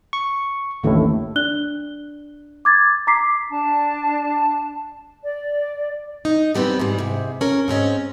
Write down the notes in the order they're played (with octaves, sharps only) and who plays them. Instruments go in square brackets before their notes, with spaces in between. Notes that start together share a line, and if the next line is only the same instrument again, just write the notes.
[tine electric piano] C#6
[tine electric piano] A1 D#2 A2 [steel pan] D3 A3 E4
[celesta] D4 D5 F#6 G7
D6 G#6 A6
A#5 D6 B6 C7
[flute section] D4 A5
D5
[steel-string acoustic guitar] D#4
F#2 G3 B3 C4
G#2 E3 G3
G#2 C3
C#4 A#4
G#2 C4 C#4 D#5